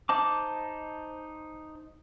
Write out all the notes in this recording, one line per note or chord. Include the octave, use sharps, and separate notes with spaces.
D#4 C5 D#5 A5 D6